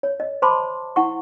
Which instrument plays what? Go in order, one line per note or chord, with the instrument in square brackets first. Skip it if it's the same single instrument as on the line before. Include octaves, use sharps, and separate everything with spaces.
[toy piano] C#5
D#5
C5 A5 B5 C6 D6
E4 F#5 C#6